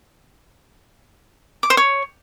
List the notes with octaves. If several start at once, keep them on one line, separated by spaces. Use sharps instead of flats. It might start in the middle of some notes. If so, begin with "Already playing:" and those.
D6
C5
C#5